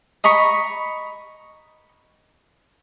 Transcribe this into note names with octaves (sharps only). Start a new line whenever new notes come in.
D#5 A#5 B5 C#6